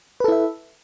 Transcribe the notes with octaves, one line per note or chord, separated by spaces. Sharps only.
E4 A4 B4 E5